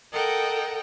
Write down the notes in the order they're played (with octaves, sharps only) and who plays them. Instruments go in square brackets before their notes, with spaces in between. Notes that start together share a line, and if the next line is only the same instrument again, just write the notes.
[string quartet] A4 A#4 D#5 F#5 G5